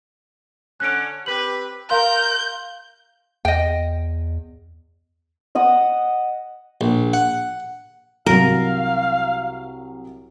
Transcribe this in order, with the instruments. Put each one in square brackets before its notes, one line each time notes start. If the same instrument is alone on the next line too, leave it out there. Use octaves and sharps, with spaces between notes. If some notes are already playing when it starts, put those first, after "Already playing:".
[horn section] D3 C#4 [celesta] F#6 D7
[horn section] C4 G4 B4 [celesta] F#7
[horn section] A#4 [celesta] F5 C6 [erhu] G6
[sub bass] E2 [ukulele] D#5 G5
[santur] D#5 F#5 D#6
[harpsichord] A#1
F#5
[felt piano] C2 F#3 [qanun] A#4 [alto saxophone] F5